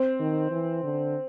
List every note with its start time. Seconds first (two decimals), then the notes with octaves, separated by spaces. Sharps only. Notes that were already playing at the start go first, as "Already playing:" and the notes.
Already playing: C4
0.20 D#3
0.51 E3
0.84 D3